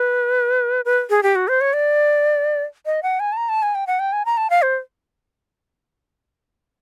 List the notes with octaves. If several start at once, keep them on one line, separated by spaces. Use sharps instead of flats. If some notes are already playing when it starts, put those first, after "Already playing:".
Already playing: B4
B4
G#4
G4
F#4
C5
C#5
D5
D#5
F#5
G#5
A5
A#5
A5
G#5
G5
F#5
G5
G#5
A#5
A5
F5
C5